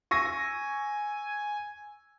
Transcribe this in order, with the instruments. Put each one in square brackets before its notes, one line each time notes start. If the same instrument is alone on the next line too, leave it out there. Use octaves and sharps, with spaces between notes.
[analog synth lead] G#5 [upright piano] C#6 E6 A#6